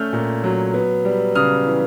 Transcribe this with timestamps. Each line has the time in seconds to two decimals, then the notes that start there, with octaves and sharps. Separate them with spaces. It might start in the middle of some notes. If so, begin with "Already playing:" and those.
Already playing: A3 C#4 F6 G6
0.13 A#2
0.43 F#3
0.74 B3
1.05 G3
1.35 C#3 D#6 F6
1.67 E3